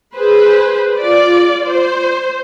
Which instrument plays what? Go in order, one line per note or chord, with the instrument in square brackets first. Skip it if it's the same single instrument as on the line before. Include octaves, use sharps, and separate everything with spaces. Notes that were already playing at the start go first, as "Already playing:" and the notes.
[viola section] G#4 B4 C5
F4 D5
C5